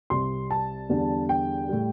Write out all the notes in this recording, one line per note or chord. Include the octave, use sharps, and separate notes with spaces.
C2 C3 G3 C6
A5
E2 D3 G3
G5
A2 G3